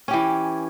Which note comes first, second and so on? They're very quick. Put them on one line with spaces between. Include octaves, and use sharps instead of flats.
C#4 G4 E3